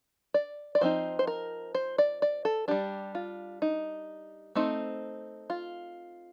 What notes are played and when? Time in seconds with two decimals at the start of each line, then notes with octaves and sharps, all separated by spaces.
0.34 D5
0.75 D5
0.81 F3 C4 D#4 C5
1.19 C5
1.27 A#4
1.75 C5
1.98 D5
2.22 D5
2.45 A4
2.68 G3 D4 G4
3.15 F4
3.62 D#4
4.55 A3 C4 D#4
5.50 F4